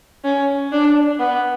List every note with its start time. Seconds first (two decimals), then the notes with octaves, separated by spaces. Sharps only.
0.25 C#4
0.72 D4
1.19 B3